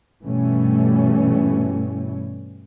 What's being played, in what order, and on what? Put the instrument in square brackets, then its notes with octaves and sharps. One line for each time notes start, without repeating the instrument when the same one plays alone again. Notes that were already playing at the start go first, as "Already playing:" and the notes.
[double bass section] G2 B2 E3 G3 A3 C#4